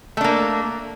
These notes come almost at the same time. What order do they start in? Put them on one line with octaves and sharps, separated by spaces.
A3 D4 A#3